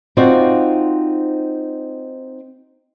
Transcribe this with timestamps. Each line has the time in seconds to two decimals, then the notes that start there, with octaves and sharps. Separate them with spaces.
0.17 C4 D#4 F4 F#4 C5 D5